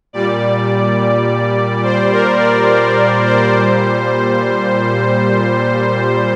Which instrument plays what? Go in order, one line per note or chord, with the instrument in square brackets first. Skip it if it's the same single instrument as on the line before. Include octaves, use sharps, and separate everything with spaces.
[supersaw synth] A#2 G3 D5
C5
A#4
D5
C5
A#4
C5
A#2 G3